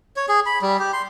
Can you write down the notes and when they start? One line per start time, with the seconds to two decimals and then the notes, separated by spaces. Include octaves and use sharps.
0.16 C#5
0.29 G#4
0.46 B5
0.62 G3
0.79 G4
0.93 C6